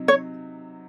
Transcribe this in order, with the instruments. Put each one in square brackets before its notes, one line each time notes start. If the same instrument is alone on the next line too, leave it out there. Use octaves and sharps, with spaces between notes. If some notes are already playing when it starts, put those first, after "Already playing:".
Already playing: [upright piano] C3 F#3 D#4
[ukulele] C#5